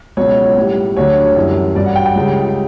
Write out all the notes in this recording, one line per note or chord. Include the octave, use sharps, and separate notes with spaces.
C#2 B2 F#3 C#5
A2 G3
D2 D3 F#3 C#5
F#2 E3 G3
G2 F#3 D5
F#5
G5
G5
C#2 C#3 G3